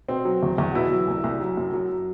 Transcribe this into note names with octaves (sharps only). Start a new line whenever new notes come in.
B2 C4
F#3
E2
E2
B2 E4
F#3
C2
C2
F#3
F#2
F#3